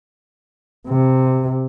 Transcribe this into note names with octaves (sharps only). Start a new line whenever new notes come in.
C3